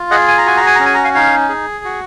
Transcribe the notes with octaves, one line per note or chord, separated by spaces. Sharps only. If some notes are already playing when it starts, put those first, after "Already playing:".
Already playing: F4
G#4 D#5 F#5
G#5
A#5
F#4 G#5
A#5
G#5
C#4 A#5
G#5
A#5
F5 G#5
D#4 C#5 F5
G#4
F#4